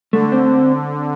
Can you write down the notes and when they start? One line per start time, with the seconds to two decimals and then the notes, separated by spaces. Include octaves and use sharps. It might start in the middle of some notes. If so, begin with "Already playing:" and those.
0.13 D3 A3
0.32 C4